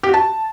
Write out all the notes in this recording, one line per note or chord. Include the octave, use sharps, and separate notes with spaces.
G4
F#4
A5